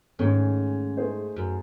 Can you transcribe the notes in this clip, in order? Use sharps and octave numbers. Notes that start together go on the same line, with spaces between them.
G#2 D#3 A3 C#4
A3 D#4 G#4 C5
F#2